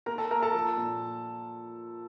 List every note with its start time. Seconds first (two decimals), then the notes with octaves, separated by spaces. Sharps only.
0.06 A#3 A#4 A#5
0.18 A4 A5
0.31 A#3 A#4 A#5
0.42 A4 A5
0.54 F3
0.78 A#2